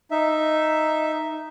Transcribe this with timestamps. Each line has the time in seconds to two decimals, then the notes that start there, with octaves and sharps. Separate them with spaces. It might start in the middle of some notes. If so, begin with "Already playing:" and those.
0.11 D#4 E5